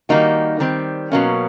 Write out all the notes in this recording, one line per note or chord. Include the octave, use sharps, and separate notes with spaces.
D#3 G3 A#3 D#4 F#4
D#3 G3 C4
B2 F#3 A#3 C#4